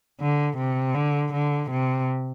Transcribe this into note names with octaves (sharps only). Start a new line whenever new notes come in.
D3
C3
D3
D3
C3